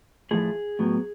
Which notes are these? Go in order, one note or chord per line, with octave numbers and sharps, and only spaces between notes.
A2 F3 A3 G#4
A2 F#3 B3